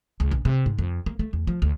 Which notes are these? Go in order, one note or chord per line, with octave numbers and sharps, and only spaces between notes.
C#2
A#1
C3
G#2
F2
A#3
A3
E2
F3
D2